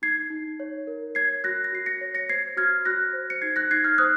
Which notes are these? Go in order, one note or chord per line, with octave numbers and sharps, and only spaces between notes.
D#4 G#6 C7
D#4
C#5
A#4
C#5 G#6 C7
F#4 F#6 A#6
A#6
F#4 C7
A#6 C#7
C#5
A#6 C#7
C5 G#6 C7
F#4 F6 G#6
F#4 F#6 A#6
C5
C#7
D#4 G#6 C7
F#6 A#6
D#4 G#6 C7
F6 G#6
C5 D#6 F#6